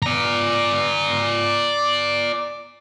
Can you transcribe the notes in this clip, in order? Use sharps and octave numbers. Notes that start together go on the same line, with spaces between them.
D5 A#5